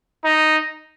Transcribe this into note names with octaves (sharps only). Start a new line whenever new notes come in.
D#4